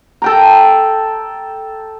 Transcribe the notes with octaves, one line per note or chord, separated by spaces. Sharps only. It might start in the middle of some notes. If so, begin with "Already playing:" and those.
A4 G5 A#5